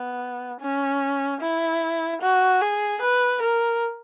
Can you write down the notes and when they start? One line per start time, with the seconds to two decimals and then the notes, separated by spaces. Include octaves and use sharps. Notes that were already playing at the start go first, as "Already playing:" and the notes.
Already playing: B3
0.60 C#4
1.41 E4
2.22 F#4
2.61 G#4
3.02 B4
3.42 A#4